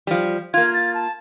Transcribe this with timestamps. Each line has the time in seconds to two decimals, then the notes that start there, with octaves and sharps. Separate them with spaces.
0.07 F3 G3
0.54 A#3 F4 G#6
0.74 A6
0.94 A5